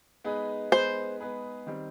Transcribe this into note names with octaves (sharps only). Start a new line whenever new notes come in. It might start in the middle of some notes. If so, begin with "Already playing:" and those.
G#3 B3 D#4 G#4 B4
G#3 B3 D#4 G#4 B4 C5
G#3 B3 D#4 G#4 B4
D#3 G3 C4